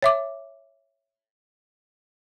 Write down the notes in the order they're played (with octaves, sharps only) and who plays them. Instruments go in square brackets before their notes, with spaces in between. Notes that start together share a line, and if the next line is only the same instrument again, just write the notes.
[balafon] C#5 E5 D6